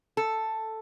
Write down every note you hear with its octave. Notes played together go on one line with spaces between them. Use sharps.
A4